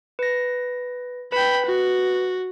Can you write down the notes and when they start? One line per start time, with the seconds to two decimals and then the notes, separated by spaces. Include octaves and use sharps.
0.19 B4 A#6
1.32 B4 G5 B5
1.66 F#4